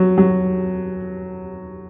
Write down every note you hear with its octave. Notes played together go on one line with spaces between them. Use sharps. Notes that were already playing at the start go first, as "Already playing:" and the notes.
Already playing: F#3
F#3